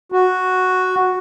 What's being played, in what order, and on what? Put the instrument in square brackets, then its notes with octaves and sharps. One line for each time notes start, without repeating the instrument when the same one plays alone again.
[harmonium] F#4